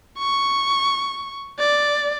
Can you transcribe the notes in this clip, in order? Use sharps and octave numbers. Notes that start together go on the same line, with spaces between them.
C#6
D5